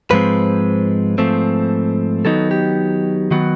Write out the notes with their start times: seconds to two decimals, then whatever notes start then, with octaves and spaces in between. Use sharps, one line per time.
0.11 G#2 F3 G#3 C4 B4
1.18 G#2 F3 A3 C4
2.25 D#3 F#3 B3 D#4 A4
2.51 G4
3.31 D#3 F#3 B3 F#4